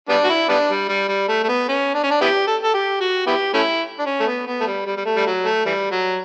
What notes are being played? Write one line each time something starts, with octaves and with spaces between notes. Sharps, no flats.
G3 B3 D4
F#4
E4
G3 B3 D4
G3
G3
G3
A3
A3
B3
C#4
D4
C#4
D4
B3 E4 G4
A4
A4
G4
F#4
B3 E4 G4
A3 C#4 E4
D4
C#4
A3
B3
B3
A3
G3
G3
G3
A3
G3
F#3
A3
E3 G3
F#3